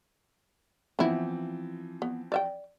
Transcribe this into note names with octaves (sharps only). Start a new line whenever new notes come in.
E3 F3 B3 C4 E4
B3
D5 E5 G5